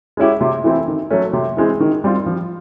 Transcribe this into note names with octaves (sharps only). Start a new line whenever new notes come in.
G#3 C#4 E4 G4
C3
E3 A3 C4 E4
D#3
F#3 A3 C#4
C3
E3 G#3 C4
D#3
G3 C4 F4
F3